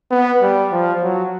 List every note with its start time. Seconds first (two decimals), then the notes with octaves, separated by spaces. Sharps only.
0.11 B3
0.42 G3
0.72 F3
1.03 F#3